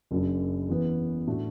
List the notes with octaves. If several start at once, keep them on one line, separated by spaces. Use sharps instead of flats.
F#1 F#2 F#3 D4
E2 E3 B3
A2 A3 D4 F#4